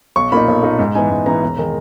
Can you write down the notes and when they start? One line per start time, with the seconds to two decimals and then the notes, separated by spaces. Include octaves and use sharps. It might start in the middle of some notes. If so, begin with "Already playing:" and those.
0.16 B1 C#6
0.32 A#2 A#3 D#4 B5
0.48 B1
0.63 A#2 A#3 D#4
0.79 G#2
0.95 E3 B3 D#4 G#5
1.10 G#2
1.26 E3 B3 D#4 A#5
1.42 E1
1.58 D#3 G#3